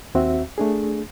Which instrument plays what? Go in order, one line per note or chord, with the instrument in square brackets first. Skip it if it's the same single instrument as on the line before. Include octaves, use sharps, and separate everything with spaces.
[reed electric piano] D#2 C4 F#4 E5
A3 D4 G#4